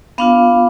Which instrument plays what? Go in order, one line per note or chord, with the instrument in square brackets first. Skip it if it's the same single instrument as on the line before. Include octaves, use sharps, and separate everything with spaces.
[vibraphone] B3 D4 F4 F5